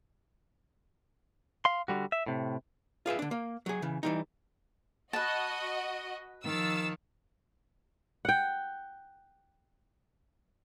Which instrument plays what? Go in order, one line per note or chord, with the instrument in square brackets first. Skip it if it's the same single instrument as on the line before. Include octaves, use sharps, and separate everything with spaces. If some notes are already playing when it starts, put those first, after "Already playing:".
[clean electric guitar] F5 C6
D3 G3 F#4
E5
A2 C3
[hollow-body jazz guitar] F4 G#4 B4 E5
D3 D4
A#3
F#3 G#4
C#3 E3
E3 G3 D#4
[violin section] F#4 D#5 [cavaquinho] B4 A5
[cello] D#3 F3 [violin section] E6 A6
[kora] F#5 G5